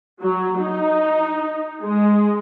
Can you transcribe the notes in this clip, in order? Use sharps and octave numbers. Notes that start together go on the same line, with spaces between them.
F#3
D#4
G#3